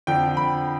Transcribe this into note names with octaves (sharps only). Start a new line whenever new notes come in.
F2 D3 F3 G5
B5